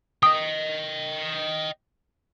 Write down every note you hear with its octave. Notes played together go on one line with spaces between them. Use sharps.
D#5 G5 D#6